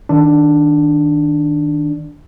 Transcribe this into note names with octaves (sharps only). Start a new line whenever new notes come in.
D#3 D4